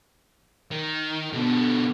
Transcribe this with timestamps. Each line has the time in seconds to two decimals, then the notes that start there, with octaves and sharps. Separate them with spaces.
0.71 D#3
1.33 B2 D3 B3 A4